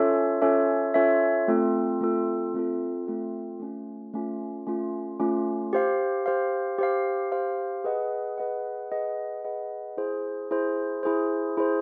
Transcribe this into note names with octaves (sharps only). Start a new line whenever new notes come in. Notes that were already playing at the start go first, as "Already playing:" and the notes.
Already playing: C#4 F4 A4 C#5 E5
C#4 F4 A4 C#5 E5
C#4 F4 A4 C#5 E5
A3 C4 F4 A4
A3 C4 F4 A4
A3 C4 F4 A4
A3 C4 F4 A4
A3 C#4 F4
A3 C#4 F4
A3 C#4 F4
A3 C#4 F4
G4 C5 F5
G4 C5 F5
G4 C5 F5
G4 C5 F5
G#4 B4 D#5 F#5
G#4 B4 D#5 F#5
G#4 B4 D#5 F#5
G#4 B4 D#5 F#5
E4 G#4 C5
E4 G#4 C5
E4 G#4 C5
E4 G#4 C5